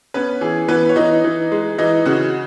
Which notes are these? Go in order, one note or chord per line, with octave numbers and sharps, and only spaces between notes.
B3 C#4 B4
E3 G#4
E3 B3 B4
C#5
E3 D#4 D#5
E3
G#3
E3 D#4 D#5
C#3 F#4 F#5